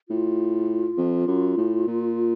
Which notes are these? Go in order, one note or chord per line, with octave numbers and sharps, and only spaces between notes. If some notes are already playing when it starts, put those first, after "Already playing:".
A2 F4
F2
F#2
A2
A#2